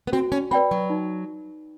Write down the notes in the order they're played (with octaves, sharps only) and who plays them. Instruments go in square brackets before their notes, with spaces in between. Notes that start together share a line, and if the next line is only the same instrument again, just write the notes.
[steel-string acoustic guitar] B3
[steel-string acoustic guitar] C4 [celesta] F#4
[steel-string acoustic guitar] C#4
[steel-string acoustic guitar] C4 [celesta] B4 D5 G5 B5
[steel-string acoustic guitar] F#3
[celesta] D#4